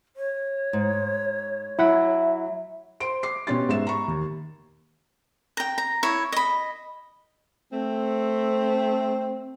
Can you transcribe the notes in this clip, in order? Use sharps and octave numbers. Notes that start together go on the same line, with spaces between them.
C#5
G#2
F#3 E4 E5 F#5 B5
C5 C6 D7
D6 C7
B2 B3 C#4 G4 C6 A6
G#2 E5 E7
A#5 B5 C#6
D#2
G5 A#5
A#5
E4 C#5
D#5 B5
A3 C4